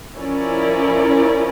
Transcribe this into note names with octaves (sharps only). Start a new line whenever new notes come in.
F3 C#4 E4 A#4 D5